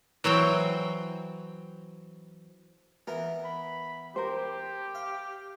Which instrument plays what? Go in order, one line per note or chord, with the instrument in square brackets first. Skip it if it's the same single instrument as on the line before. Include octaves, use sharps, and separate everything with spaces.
[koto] E3 F#3 C4 G5
[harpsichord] E3 B3 [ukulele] A#4
[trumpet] B5
[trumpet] G4 [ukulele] A#4 C5
[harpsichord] F5